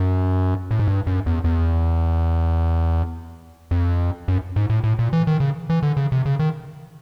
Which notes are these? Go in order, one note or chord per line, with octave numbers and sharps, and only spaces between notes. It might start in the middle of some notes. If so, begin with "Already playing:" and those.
Already playing: F#2
A2
G#2
G2
F#2
E2
E2
F2
F#2
G#2
A2
A2
A#2
E3
D#3
C#3
E3
D3
C#3
C3
C#3
D#3